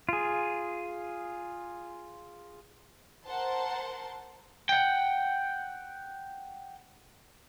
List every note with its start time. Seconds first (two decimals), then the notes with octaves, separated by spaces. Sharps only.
0.09 F4 G#4
3.25 A#4 C5 F#5 A5 C6
4.69 F#5 G5